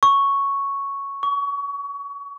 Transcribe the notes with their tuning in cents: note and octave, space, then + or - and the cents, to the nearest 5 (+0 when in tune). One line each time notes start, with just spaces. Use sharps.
C#6 +0
C#6 +30